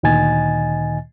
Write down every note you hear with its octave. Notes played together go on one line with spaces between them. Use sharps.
D2 A#2 D#3 D#5 G#5 A6